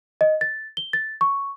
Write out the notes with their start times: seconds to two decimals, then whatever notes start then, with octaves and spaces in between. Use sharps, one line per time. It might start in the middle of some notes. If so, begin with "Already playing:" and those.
0.21 D#5
0.41 A6
0.77 G7
0.93 A6
1.21 C#6